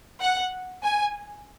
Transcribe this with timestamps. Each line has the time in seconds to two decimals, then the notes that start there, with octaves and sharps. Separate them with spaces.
0.21 F#5
0.82 G#5